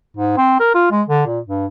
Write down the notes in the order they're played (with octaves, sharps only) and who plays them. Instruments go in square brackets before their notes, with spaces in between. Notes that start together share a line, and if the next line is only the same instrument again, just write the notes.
[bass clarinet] G#2
C4
A#4
F4
G#3
D3
A#2
G2